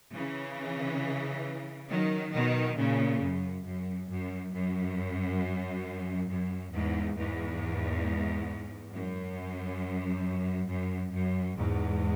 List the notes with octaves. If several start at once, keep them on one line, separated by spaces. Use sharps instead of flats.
C#3 E3
D#3 F#3
B2 D#3
A#2 C#3
F#2
F#2
F#2
F#2
F#2
E2 G#2
E2 G#2
F#2
F#2
F#2
E2 G#2